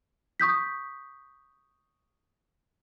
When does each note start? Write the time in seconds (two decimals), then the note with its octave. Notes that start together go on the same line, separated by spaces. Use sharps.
0.40 C#6 D#6 G6 B6